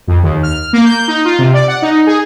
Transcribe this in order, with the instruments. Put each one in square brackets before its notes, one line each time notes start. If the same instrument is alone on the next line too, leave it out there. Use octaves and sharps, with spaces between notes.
[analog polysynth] F2
D#2
F6
A#3
G6
D#4
F4
C3
D5
F#5
D#4
G#4